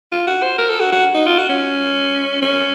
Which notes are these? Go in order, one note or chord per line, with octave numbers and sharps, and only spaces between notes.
F4
F#4
C5
A#4
A4
F#4
F#4
D#4
F4
F#4
C#4
C#4